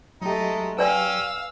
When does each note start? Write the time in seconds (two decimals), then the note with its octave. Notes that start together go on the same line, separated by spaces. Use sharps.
0.21 F#3 G#3 A3 D#4 G4
0.79 C#4 B4 D5 F5 G5 G#5 E6